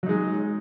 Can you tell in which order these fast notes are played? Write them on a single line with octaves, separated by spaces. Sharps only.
F#3 D#4 G#3